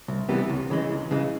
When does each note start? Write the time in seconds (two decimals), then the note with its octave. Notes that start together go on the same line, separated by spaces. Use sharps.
0.08 C2
0.29 C3 E3 G3 B3
0.50 C#2
0.70 C#3 E3 G#3
0.91 C#2
1.11 C#3 E3 G#3